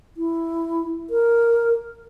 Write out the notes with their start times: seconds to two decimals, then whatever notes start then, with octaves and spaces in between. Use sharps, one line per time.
0.17 E4
1.10 A#4